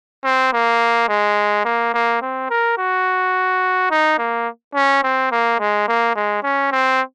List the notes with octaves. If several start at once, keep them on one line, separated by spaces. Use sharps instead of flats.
C4
A#3
G#3
A#3
A#3
C4
A#4
F#4
D#4
A#3
C#4
C4
A#3
G#3
A#3
G#3
C#4
C4